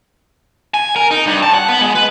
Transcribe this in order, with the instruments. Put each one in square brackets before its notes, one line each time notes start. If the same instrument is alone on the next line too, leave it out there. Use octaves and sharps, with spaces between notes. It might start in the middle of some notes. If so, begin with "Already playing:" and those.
[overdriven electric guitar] G#5
A#4
D#4
G2
A5
F#5
B3
G#3
B4